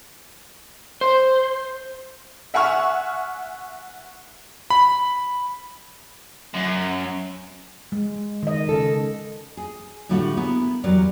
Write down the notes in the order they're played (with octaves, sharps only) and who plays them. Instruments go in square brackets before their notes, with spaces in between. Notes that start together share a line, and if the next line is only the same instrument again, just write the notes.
[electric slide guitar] C5
[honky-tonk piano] E5 F#5 G#5 C#6 F6
[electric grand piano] B5
[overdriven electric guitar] F#2
[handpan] G#3
D#3 D#5
[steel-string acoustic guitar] C#3 A4
[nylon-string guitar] G#4
A2 D3 G3 A3 F4 F#4
B3 E4 G#4 A#4
E2 F#3 G3 A#4 D5